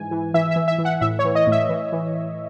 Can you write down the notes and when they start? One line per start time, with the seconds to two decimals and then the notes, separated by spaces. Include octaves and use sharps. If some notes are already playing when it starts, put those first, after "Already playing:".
Already playing: G#2 E3 G#5
0.11 E3
0.34 E3 E5
0.51 E5
0.56 E3
0.68 E5
0.79 E3
0.85 F#5
1.01 A2 E5
1.19 C#5
1.25 E3
1.35 D#5
1.47 A2 E5
1.69 E3
1.92 E3